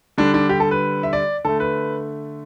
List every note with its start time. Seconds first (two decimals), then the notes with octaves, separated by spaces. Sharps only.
0.18 D3 G3 D4
0.34 D4
0.49 G4
0.60 A4
0.71 B4
1.03 E5
1.13 D5
1.45 D3 A3 A4
1.60 B4